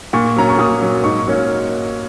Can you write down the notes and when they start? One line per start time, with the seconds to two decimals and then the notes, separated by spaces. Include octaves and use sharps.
0.13 A#2 C#6
0.36 F#3 C#4 A#5
0.49 C#6
0.59 A#2 D#6
0.81 F#3 C#4
1.04 G#2 C#6
1.27 F#3 A#3 C#4